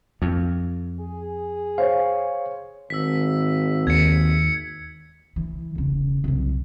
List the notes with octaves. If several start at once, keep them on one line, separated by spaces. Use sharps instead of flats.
F2
G#4
C5 C#5 F5
G#1 E6 B6
D#2 G#6 C#7
E3
E1 C#3
C2 F#2